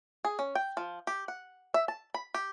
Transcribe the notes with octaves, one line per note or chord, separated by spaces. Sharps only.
G#4
C#4
G5
F3
G4
F#5
E5
A5
B5
G4